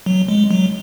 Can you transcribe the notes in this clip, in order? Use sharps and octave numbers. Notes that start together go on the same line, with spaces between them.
F#3
G#3
F#3